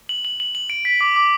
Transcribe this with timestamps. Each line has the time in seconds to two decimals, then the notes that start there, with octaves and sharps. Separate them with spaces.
0.09 F#7
0.25 F#7
0.40 F#7
0.55 F#7
0.70 D7
0.85 B6
1.01 D6
1.16 D6